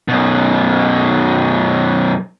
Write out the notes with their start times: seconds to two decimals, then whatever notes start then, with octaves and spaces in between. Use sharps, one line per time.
0.08 F#2 B2